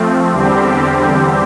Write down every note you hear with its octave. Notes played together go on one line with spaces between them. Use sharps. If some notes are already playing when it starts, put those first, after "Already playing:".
Already playing: F3 A3 C4
E2 D3 G3 C4 G4